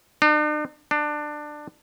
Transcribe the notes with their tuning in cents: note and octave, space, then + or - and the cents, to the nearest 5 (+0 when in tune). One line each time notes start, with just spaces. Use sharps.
D4 +45
D4 +20